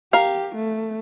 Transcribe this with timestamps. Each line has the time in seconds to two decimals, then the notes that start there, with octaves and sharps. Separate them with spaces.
0.13 G4 A#4 F5
0.55 A3